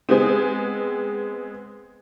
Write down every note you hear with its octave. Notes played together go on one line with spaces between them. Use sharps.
G#3 B3 C4